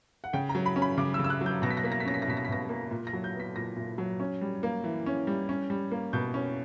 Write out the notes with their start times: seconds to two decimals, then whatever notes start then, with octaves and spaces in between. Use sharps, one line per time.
0.24 F#5
0.33 C#3 G5
0.49 A#5
0.55 F#3
0.66 B5
0.76 C#4
0.82 B5
0.97 C#3 D6
1.14 E6
1.19 C#3
1.24 E6
1.30 F#6
1.41 F#3
1.46 G6
1.62 B2 A#6
1.70 B6
1.77 A#6
1.83 A#3 B6
1.92 A#6
2.00 B6
2.05 C#4 A#6
2.14 B6
2.22 A#6
2.27 B2 B6
2.37 A#6
2.45 B6
2.49 B2 A#6
2.69 A#3
2.91 A#2
3.07 A#6
3.13 F#3
3.24 G6
3.35 B3
3.40 B6
3.56 A#2 A#6
3.76 A#2
3.98 F#3
4.20 C#4
4.41 G3
4.63 A#3
4.84 E3
5.06 C#4
5.27 G3
5.49 C#4
5.70 G3
5.91 A#3
6.13 B2 G6
6.34 C#4